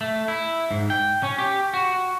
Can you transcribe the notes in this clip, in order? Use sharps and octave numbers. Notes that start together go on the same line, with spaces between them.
A3
E4
G#2
G5
C#4
G4
F#4